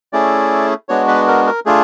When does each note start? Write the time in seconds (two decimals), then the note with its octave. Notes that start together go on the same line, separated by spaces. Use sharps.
0.13 A3 C#4 E4 G#4 D5
0.89 G#3 B3 D4 F#4 C#5
1.08 B4
1.27 A#4
1.47 A#4
1.66 A3 D4 F4 G#4